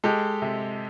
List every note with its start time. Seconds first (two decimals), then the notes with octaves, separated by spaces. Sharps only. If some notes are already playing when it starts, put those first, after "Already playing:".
0.04 G#3 G4 A4
0.42 C3